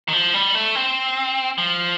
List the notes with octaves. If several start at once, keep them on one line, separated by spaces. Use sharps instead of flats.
D#3
F3
G3
A3
C4
F3